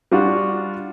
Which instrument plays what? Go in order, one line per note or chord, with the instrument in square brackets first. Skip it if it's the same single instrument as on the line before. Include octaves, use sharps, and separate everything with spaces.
[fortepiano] G3 D4 F4 F#4